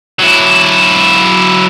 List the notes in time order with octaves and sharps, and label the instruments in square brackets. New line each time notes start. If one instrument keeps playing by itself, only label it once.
[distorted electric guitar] F#3 E4